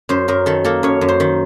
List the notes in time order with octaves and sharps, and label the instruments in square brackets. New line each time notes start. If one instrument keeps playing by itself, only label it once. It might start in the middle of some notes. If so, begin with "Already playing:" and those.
[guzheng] F#2 C5
F#2 A#4
D#3 A4
A#3 A4
F#2 C#5
F#2
C5
D#3